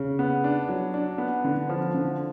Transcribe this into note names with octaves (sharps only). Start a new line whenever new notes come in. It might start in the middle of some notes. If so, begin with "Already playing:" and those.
Already playing: C#3
B3
D4
F#3
D4
B3
D3
F3
D3